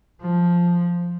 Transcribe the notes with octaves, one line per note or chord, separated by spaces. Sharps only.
F3